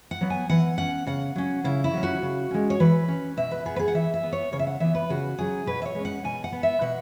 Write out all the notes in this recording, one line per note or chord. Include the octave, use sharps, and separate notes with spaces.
F#5
F#3 B3
G#5
E3 F#5
C#4 F#5
C#3 F#5
F#3 C#4
C#3 E4
E4
F#3 C#4
F#4
C#3
G#3 C#4
C#5
E3 B4
C#4
B2 E5
B4
B3 G#4
B4
G#4
F#5
E3 E5
E5
B3
C#5
C#3 C#5
E5
F#5
E3 B3 E5
B4
C#3 F#4
F#3 C#4 G#4
B2 B4
E5
C#5
G#3 C#4
F#5
B2 G#5
F#5
B3
E5
B2 F#5